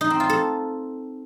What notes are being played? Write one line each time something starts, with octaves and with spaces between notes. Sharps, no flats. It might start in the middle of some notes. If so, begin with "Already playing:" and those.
D#4
C4
F4
A4